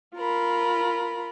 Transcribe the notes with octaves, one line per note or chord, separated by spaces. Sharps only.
F4 A#4 B5